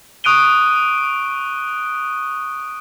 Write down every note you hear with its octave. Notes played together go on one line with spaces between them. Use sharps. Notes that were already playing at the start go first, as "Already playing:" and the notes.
C#6 D#6 F#6 D7 D#7 G7